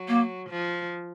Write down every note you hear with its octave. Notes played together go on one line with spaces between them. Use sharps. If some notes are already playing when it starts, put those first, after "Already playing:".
Already playing: F#3
A#3
F3